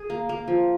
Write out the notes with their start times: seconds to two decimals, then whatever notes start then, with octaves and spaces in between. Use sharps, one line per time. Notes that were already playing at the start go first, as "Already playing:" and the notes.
Already playing: G#4
0.10 A#3
0.29 A#3
0.48 F3